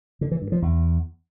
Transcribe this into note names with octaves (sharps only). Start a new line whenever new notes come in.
D3
E3
G2
F3
E2